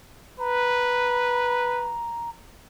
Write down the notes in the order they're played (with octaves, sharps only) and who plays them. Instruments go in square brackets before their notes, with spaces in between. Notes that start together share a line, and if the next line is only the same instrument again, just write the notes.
[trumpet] B4 [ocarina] A#5